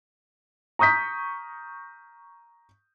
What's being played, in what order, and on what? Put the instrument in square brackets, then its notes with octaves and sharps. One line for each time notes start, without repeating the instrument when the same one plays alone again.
[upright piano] A#5 C#6 D#6 G6 B6